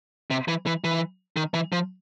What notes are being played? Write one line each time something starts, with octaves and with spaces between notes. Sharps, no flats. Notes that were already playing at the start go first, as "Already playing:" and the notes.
C3
E3
E3
E3
D#3
E3
F3